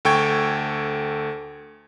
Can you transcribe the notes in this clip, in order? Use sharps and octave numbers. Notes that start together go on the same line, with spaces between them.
D2 A4 G5 C#6 G#6